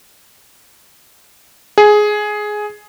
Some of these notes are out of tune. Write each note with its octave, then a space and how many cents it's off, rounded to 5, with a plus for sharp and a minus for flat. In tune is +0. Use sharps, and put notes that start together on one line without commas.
G#4 +10